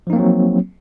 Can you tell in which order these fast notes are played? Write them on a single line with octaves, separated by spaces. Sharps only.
F3 D#4 A#3 C4 F#3